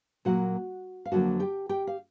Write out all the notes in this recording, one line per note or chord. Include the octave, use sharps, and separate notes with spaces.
A#2 F#3 A#3 F#4 F#5
F5
F2 D3 F#3 A#3 F#4 F#5
G4 G5
G4 G5
F5